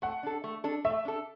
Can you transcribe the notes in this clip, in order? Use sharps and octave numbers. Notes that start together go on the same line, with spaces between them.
A3 F#5
D4 A4
A3
D4 A4
A3 E5
D4 A4